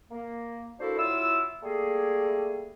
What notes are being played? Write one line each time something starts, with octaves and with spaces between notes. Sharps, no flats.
A#3
A#3 D4 E4 F#4 A4 C5
F#3 E4 F4 E6
G3 A3 A#3 G#4